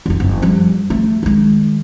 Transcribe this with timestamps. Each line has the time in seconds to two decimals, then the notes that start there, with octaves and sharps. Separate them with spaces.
0.06 F1 D#3
0.20 F#1
0.42 F3 G3
0.90 A3
1.23 D#3 G#3